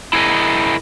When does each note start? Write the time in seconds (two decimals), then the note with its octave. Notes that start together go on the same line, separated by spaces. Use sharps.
0.13 E4 G#4 A#4 D#5